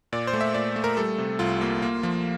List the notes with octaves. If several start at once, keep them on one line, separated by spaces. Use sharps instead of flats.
A#2 D5
C5
A3
E5
A#2 D5
A3
A#4
G3 A4
C3
C2 F4
A#3
A#3
F3